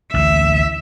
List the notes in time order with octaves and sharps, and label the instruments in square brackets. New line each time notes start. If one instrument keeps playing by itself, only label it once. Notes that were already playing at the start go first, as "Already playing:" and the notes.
[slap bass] A1 D2 E3 [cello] E5